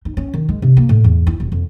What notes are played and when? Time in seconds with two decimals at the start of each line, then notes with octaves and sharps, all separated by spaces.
0.05 D#4
0.17 C#4
0.34 D#3
0.49 G#3
0.62 C3
0.77 A#3
0.89 A2
1.04 E2
1.27 E4
1.40 D#1
1.52 F2